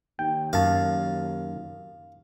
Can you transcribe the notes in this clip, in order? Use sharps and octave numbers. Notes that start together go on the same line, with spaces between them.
D#2 G5
F#2 F5 A5